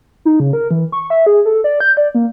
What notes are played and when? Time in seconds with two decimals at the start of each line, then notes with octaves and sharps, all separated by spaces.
0.25 D#4
0.40 C#3
0.53 A#4
0.71 E3
0.92 C#6
1.10 E5
1.26 G#4
1.45 A4
1.64 D5
1.80 G6
1.97 D5
2.15 A#3